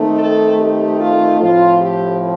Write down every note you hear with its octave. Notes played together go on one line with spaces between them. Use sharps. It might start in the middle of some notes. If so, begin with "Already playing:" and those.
Already playing: D#3 A3 C4 D#4
A4
G4
F4
A2 F3 C4 F4
G4